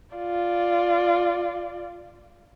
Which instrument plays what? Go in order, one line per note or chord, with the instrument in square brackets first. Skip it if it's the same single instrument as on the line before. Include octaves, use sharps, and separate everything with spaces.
[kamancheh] F4 D5